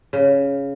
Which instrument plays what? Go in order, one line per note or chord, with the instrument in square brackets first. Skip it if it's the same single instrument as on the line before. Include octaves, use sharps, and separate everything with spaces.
[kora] C#3